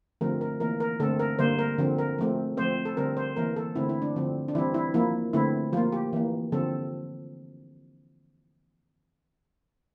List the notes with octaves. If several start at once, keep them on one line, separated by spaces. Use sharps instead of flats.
D3 F3 A3 C4 A#4
A#4
E3 A#3 A#4
A#4
D3 A3 C4 A4
A#4
D3 G3 A#3 C5
A#4
D3 F3 C4
A#4
F3 A3 C4
F3 A3 C4 C5
A4
D3 G3 C4 A#4
C5
E3 A#3 A#4
A4
D3 A3 C4 E4
E4
D4
D3 F3 C4
D4
E3 G3 C4 E4
E4
F3 A#3 E4
D3 A3 C4 E4
F3 A#3 F4
G4
E3 A#3
D3 F3 C4 A4